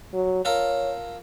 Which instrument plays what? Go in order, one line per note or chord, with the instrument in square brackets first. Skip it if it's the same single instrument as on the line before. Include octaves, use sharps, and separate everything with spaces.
[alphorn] F#3
[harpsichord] F4 A4 A#4 [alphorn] C#5